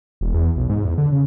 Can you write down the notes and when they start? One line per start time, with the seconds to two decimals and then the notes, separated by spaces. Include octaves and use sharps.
0.21 E1
0.34 E2
0.57 B1
0.69 G#2
0.85 E2
0.98 D3
1.12 C#3